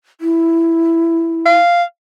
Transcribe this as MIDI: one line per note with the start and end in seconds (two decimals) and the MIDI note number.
0.21 1.55 64
1.46 1.83 77